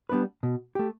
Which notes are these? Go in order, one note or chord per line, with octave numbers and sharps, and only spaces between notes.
G3 B3 D4 B4
B2
A3 G4